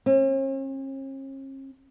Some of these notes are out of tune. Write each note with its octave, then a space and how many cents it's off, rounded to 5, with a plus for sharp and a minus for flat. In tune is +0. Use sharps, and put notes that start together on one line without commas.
C#4 -45